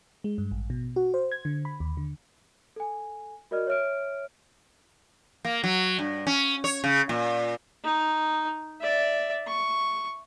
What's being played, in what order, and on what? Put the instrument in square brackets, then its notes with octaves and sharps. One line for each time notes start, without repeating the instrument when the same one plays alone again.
[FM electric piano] G#3
G2
A1
B2
F#4
C5
G#6
D3
B5
D#2
D3
[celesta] A4 G#5
F#4 A#4 D5 D#5 F6
C#5 E5 F6 D7
[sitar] A#3
F#3
G2
C#4
C#5
C#3
A#2
[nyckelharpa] D#4
D5 E5
C#6